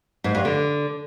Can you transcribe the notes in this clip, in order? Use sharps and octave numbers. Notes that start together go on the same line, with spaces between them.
G#2
G2
D3